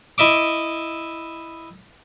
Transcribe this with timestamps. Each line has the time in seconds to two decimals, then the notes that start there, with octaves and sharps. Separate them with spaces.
0.18 E4 D#5 E5 D6